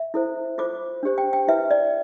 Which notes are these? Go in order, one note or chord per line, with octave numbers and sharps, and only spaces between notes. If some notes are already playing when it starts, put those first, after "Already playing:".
Already playing: E5
E4 A4 C5
F4 A4 C5 D6
D4 G4 C5
G5
G5
E4 B4 E5
D5